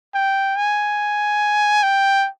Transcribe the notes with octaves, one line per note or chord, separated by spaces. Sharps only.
G5
G#5
G5